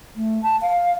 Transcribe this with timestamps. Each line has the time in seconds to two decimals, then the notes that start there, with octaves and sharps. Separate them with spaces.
0.15 A3
0.42 A5
0.61 F5